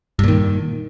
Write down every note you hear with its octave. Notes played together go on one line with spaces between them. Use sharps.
G2 A#2 D#3